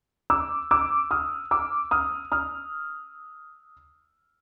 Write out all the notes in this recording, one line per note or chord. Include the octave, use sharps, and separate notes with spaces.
D6 E6
D6 E6
D#6 F6
D6 E6
D#6 F6
D#6 F6